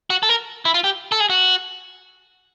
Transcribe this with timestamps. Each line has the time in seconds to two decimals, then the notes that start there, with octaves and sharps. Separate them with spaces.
0.10 F#4
0.23 A4
0.29 A#4
0.65 E4
0.74 F4
0.84 G4
1.12 A4
1.20 G#4
1.30 F#4